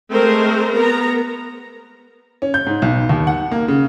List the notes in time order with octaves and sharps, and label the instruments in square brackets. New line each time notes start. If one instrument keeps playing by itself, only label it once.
[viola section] G#3 A3 C4 A#4 C5
B3 A#4 A#5
[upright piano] C#4
G6
G#2
B1
D#2
F#5
A#3
C#3